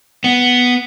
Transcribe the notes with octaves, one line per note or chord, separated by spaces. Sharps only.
B3